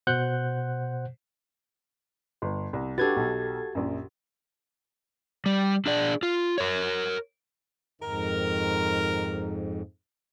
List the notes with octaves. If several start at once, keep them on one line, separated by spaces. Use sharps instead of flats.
B2 C5 F#5 F#6 G6
G1
C2
D4 F#4 G4 A4 B4 G#6 A6
B1
A#1 F#2
G3
D4 G#4 D5
F4
A#4 C#5
F2 G#2 D#3 A#4